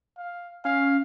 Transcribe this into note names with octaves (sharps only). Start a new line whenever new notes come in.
F5
C#4 F5